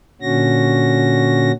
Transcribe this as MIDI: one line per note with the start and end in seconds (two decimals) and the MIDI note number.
0.21 1.52 46
0.21 1.52 50
0.21 1.52 61
0.21 1.52 66
0.21 1.52 94